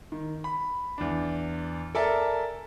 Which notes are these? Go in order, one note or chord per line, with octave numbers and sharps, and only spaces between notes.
D#3
B5
E2 D4
A4 A#4 D5 E5 G#5 A5